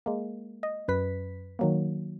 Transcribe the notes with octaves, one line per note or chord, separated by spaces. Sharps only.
G#3 A#3
D#5
F#2 B4 B6
D#3 F#3 A#3